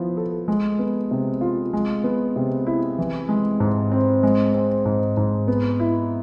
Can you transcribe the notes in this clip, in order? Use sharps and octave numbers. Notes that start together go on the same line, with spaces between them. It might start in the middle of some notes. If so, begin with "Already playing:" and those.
Already playing: F3 B3 E4
A4
G#3
B3
C3
F4
G#3
B3
C3
E4
E3
G#3
G#2
C4
G#3
C4
G#2
G#2
B3
E4